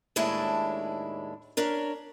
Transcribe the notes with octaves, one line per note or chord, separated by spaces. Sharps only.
D#2 A2 G#3 D4 E4 A5
C#4 D4 A#4